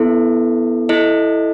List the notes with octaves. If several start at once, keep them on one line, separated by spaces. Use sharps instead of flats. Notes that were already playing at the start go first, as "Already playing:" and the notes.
Already playing: B3 E4 A4
E4 A4 D#5